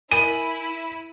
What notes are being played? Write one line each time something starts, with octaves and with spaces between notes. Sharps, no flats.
E4 A#4 G#5 D#7